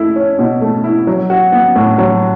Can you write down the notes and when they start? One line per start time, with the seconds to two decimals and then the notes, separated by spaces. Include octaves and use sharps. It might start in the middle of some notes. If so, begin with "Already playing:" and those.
Already playing: A3 E4
0.16 C#4
0.39 B2
0.61 A3
0.84 E4
1.07 F#3
1.30 F#4
1.52 B3
1.76 A2
1.98 F#3